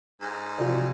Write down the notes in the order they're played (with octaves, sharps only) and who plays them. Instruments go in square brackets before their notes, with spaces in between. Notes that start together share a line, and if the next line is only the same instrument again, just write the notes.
[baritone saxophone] G#2
[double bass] C3 F3 [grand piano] F4 F#4 D5